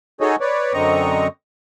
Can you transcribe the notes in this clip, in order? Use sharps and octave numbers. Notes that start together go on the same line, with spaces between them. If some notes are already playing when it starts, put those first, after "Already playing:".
D#4 F#4 G#4 A4 C#5 D#5
B4 C#5 D5
F#2 D3 C4 D#5 A#5 C#6